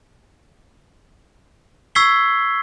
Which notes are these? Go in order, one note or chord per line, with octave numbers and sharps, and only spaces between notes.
C#6 E6 G#6 B6 C7 G7